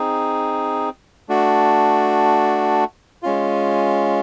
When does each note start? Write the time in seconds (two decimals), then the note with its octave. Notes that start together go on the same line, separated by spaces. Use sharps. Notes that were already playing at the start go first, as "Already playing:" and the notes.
Already playing: C4 D#4 G#4
1.29 A3 D4 F#4
3.23 G#3 C#4 F4